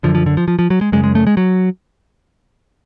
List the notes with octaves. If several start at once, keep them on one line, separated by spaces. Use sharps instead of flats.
F#2 D3 F3
F3
D3
F3
F3
F3
F#3
G#3
F#2 C#3 G#3
G#3
A3
G#3
F#3